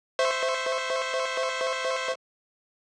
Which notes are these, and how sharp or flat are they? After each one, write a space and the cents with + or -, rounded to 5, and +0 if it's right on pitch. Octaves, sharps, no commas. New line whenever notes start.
C5 -15 E5 +0 C#6 -30